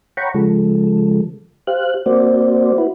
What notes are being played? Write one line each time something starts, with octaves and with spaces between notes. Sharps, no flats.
C#5 F#5 G5 A#5 B5 C#6
C#3 F3 G#3 A4
G4 C5 F5 F#6
A#3 C4 F#4 C5 D5
E4 F#4 B4